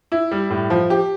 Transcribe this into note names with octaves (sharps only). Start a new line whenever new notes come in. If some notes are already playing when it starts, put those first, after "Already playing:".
E4
G3
A2
F3
G4